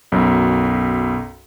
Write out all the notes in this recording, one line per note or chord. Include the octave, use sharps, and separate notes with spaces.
B1 F#2